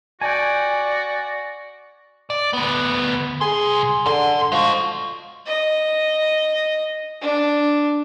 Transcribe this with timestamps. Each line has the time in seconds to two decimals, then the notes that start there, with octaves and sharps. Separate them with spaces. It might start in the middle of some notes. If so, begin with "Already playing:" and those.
0.21 F#4 D5 G5 G#5
2.30 D5
2.53 D2 B3
3.41 C2 G#4 C6
4.06 F#2 D3 C6
4.52 F3 G#3 F#4
5.46 D#5
7.21 D4